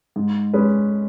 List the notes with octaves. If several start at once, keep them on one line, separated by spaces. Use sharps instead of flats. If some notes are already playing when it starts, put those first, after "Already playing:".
G#2
G#3 C#4 B4